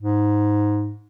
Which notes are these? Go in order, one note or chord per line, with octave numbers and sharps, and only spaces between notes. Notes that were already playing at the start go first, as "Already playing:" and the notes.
G#2